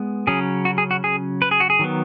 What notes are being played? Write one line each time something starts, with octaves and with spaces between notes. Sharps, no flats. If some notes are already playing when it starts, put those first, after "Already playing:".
Already playing: G#3 B3
C#3 F#3 C#4 G#4
F#4
G#4
F#4
G#4
B4
G#4
F#4
G#4
D#3 F#3 B3